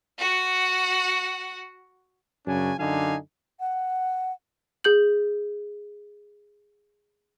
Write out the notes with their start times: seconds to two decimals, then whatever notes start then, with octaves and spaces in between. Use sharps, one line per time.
0.19 F#4 F#5
2.47 F#2 C#3 F#3 C#4 D4 G#5
2.79 F#2 D3 D4 D#4 F5 G#5
3.60 F#5
4.84 G#4 G6 F#7